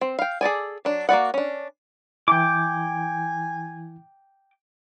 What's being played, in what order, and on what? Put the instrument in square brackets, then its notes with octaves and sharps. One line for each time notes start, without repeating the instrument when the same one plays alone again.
[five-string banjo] C4
F5 G5
G#4 A4 D5 G#5
F#3 D4
A#3 F#4 D5 F#5
C#4 D4
[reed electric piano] E3 E4 [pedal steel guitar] G5 D6 [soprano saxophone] G#5